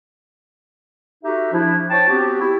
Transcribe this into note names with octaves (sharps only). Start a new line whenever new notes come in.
D#4 F#4 G4 A4 E5
F3 D4 E4
C5 C#5 G5 A5
B3 C4 F#4 G4
E4 G4